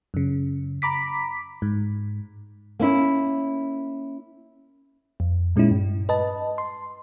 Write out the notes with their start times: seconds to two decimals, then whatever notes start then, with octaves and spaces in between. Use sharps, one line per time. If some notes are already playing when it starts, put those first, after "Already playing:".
0.14 F#2 C#3
0.82 A#5 B5 D6 B6
1.62 G#2
2.79 A#3 C#4 E4
5.20 F2
5.56 A#2 G#3 C#4 D#4 E4
5.71 G2
6.09 B4 D#5 A5
6.58 C6